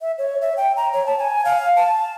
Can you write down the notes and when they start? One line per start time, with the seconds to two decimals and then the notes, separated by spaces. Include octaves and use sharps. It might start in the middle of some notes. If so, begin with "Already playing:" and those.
0.01 E5
0.18 C#5
0.42 E5
0.57 G5
0.77 A#5
0.93 C#5
1.06 A5
1.19 G#5
1.45 F5
1.76 A5